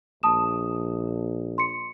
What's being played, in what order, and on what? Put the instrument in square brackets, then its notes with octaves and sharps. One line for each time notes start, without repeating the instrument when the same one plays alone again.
[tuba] A#1 [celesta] A5 D#6 E7
[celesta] C6 C#7